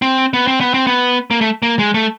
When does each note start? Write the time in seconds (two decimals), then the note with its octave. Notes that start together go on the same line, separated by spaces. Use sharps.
0.02 C4
0.34 B3
0.47 C4
0.61 B3
0.74 C4
0.87 B3
1.31 A#3
1.41 A3
1.62 A#3
1.79 G#3
1.94 A3